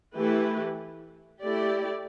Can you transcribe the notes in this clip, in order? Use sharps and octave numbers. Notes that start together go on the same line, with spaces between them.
E3 A3 E4 G4 B4
A3 E4 G4 D5